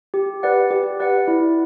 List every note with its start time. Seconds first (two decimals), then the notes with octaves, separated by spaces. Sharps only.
0.14 G4
0.43 B4 D5 F#5
0.71 G4
1.00 B4 D5 F#5
1.28 E4